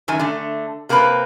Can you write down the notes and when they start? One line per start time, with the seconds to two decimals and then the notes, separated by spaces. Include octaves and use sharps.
0.08 F#2 D#3 G#5
0.19 D3 A3
0.89 C3 A#3 C4 D4 B4